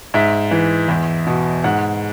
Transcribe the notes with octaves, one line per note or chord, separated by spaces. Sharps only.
G#2 E5
E3
E2
B2
G#2 F#5